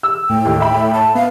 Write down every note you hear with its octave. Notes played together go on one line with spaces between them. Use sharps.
E6
A2 G5
D#2
E5 B5
A5
B3 F5